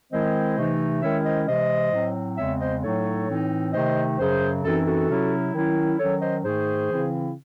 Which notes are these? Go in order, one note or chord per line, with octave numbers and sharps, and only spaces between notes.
D#3 G#3 C4 E4 C5 D#5
C3 E3 A3 D#4
D#3 G#3 C#4 E4 C#5 E5
C5 D#5
C3 E3 G#3 C5 D#5
A2 F#3 C4
E2 C#3 G#3 C4 C#5 E5
C5 D#5
A2 F#3 A3 D#4 A4 C#5
A2 E3 C4 D#4
C3 D#3 A3 D#4 C5 D#5
F#2 C#3 F#3 G#4 C5
F#2 E3 C4 D#4 F#4 A4
F#4 A4
C3 F#3 C#4 E4
D#3 F#3 C#4 E4
D#3 F#3 C#4 A4 C#5
C5 D#5
G#2 D#3 A3 G#4 C5
C#3 E3 C4 E4